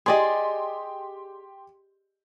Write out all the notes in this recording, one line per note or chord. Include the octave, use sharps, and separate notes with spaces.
G4 G#4 D5 D#5 C6